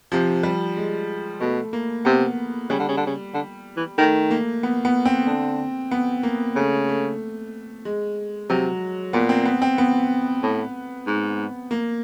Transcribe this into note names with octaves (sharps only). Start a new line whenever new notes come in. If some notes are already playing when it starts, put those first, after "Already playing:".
C3 F3
G3
G#3
B2 A3
A#3
C3 B3
C#3 G3
D3
C#3
D3
C#3
D3
E3
D#3 A3
A#3
B3
B3
C4
D3
B3
A#3
C#3 A3
A3
G#3
C3 F#3
A#2 B3
C4
B3
C4
B3
A2
G#2
A#3